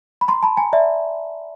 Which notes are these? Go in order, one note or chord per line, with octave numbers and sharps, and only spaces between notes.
B5
A#5 C6
A5 B5
G#5 A#5
D5 E5